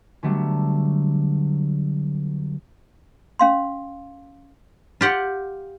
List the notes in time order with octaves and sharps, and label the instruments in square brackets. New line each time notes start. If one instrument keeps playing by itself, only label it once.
[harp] D3 F#3 G3 A3 B3 D4
[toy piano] C#4 F5 C6
[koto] F4 G4 F#5